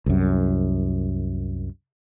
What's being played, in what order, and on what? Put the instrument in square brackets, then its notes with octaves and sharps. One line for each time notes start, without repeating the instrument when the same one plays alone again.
[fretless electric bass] C2 F#2